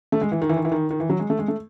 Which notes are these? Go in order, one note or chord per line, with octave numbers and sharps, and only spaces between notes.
A3
G#3
E3
D#3
E3
D#3
E3
D#3
D#3
E3
F#3
G#3
A3
G#3
A3